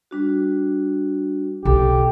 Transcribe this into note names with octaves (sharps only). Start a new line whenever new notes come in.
G3 D4 F#4
B1 G4 A4